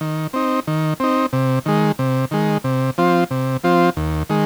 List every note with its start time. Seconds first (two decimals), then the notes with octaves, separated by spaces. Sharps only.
0.01 D#3
0.33 C4 D#4
0.67 D#3
1.00 C4 D#4
1.33 C3
1.66 D#3 G#3
1.99 C3
2.31 D#3 G#3
2.64 C3
2.98 F3 C4 F4
3.31 C3
3.64 F3 C4 F4
3.97 D#2
4.29 D#3 G#3